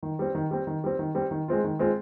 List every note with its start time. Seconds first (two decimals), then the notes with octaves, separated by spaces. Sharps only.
0.03 D#3
0.19 G3 C4
0.35 D#3
0.51 G3 C4
0.67 D#3
0.84 G3 C4
0.99 D#3
1.15 G3 C4
1.31 D#3
1.48 G#3 C4 F4
1.64 D#3
1.79 G#3 C4 F4